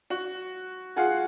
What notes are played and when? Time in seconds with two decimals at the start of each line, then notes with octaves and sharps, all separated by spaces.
0.10 F#4
0.96 F4 G#4 F#5